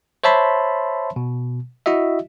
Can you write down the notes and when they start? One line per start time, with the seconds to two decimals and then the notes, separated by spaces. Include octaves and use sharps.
0.24 C5 C#5 E5 A5 B5 C6
1.16 B2
1.86 E4 F#4 D#5 E5